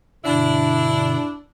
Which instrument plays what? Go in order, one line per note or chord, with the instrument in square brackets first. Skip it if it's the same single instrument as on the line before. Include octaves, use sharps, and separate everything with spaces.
[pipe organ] G2 B2 D3 [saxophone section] D4 E4